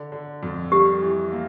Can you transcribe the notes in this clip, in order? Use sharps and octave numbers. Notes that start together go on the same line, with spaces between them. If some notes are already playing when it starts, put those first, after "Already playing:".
Already playing: D3
D3
F2
G3 G4
E3
A#3